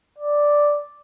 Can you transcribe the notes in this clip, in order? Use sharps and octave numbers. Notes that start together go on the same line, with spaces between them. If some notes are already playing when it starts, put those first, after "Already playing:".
D5